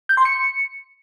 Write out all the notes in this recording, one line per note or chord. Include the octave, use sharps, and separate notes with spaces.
G6
C6
C#7